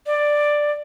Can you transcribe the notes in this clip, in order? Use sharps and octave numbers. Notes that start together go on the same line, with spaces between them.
D5